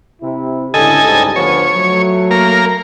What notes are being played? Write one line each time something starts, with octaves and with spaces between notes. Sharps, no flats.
C3 E4
C#2 A2 D3 A4 D#5 G#5
C#2 G#2 G3
D2 F3 B3 C#5
F#3 A3
A#3 A#4